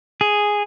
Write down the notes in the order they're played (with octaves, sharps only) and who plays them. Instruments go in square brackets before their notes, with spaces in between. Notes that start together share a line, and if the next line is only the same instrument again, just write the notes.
[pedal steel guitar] G#4